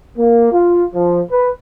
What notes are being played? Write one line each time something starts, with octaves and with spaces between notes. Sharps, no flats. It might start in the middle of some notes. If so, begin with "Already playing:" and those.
A#3
F4
F3
B4